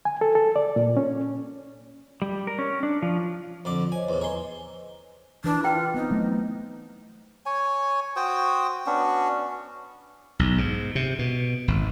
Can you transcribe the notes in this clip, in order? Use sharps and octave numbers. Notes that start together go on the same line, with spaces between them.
G#5
A4
A4
D5
A#2
C#4
G3
A#4
C#4
D4
F3
F2 D3 D6
C5 C#5 D#5 G#5
E2 A2
C#5 D#5 G#5 A#5 C6
E3 D4 B4
E4 F4 G5
B3 C4 D#4
F#3 A3
C#5 G#5
F#4 C5 G5 D#6
B3 C#4 D4 F#4
B1
G#2
C3
B2
G#1